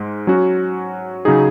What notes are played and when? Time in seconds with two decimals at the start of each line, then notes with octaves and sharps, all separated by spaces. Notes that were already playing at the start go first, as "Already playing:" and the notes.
Already playing: G#2 G#3
0.27 F#3 C#4 F#4
1.25 C#3 F#3 D#4 G#4